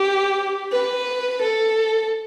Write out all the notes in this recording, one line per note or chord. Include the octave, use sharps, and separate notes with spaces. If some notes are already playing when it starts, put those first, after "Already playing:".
Already playing: G4
B4
A4